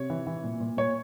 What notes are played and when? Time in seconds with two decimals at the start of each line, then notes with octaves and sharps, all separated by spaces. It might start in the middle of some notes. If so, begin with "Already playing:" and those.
Already playing: C3 C#5
0.10 E3
0.27 E3
0.44 A#2
0.60 A#2
0.77 A#2 C#5